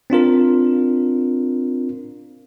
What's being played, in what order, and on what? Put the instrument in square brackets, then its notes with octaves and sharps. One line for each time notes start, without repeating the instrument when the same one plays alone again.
[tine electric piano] C4 D4 F4 A#4